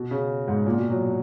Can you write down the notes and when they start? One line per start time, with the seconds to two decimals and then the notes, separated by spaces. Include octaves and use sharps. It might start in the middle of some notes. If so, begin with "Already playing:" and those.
Already playing: B2
0.11 C#3
0.48 G#2
0.66 A#2
0.78 B2
0.90 F#3